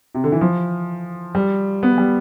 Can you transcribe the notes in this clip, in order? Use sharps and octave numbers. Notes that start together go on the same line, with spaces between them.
C3
D3
E3
F3
G3
B3
G3